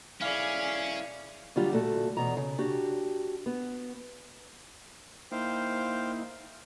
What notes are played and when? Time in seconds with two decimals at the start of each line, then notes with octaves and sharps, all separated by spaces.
0.21 B1 C#4 E4 G#4 D5 F5
1.56 D3 F#3 G3 F4 G4
1.72 A#2 A3 F#4 A4
2.17 E2 B2 A#5
2.37 C#3
2.58 D4 F#4 G4
3.46 B3
5.32 A#3 D#4 E4 C5 F5 G5